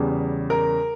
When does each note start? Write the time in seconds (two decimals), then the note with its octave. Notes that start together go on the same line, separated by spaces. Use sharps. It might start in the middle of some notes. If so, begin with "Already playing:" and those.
Already playing: E2 C#3 G3
0.50 A#4